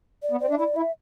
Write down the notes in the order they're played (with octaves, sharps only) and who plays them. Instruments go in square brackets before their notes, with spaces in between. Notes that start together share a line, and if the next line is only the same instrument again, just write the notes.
[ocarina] D5
[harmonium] B3
[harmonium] C4 [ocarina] D5
[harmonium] D4 [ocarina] E5
[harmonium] E4 [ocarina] D5
[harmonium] E4 [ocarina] E5